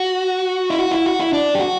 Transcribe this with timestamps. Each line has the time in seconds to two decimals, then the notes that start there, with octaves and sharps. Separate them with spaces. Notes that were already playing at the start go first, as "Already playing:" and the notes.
Already playing: F#4
0.70 E4
0.79 F#4
0.91 E4
1.06 F#4
1.20 E4
1.33 D4
1.55 G4
1.60 F#4